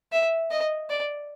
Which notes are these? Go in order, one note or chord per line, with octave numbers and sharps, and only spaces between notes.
E5
D#5
D5